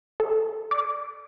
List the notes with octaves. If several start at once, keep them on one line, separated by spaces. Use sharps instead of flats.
A4
D5